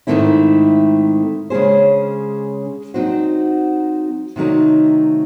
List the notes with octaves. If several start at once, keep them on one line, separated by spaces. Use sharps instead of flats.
G#2 D#3 A3 C4 E4
C#3 G#3 C#4 G#4 C5
F#3 C4 D#4 F#4 C5
C3 D#3 F#3 A3 D#4